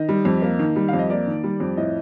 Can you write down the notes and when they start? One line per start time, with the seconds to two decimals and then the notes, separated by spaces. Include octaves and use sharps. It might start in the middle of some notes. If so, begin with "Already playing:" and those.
Already playing: D#3 D#5
0.09 G3
0.25 F2
0.42 A#3
0.59 D#3
0.76 G3
0.88 F2 F5
0.99 D#5
1.10 A#3 D5
1.27 D#3
1.44 G3
1.60 F2
1.77 A2 D#5